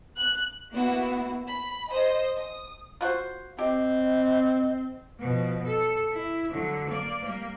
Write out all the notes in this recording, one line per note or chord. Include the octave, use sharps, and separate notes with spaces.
F#6
A#3 B3 E4 F#4
B5
C5 D#5
D#6
F4 F#4 C5
C4 G4 D#5
B2 F3
A4
E4
D3 F#3
A#3 D5
G3 A#3